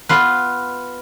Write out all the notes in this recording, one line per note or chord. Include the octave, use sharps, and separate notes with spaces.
B3 F4 B4